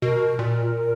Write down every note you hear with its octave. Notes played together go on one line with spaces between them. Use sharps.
B2 A#4
A#2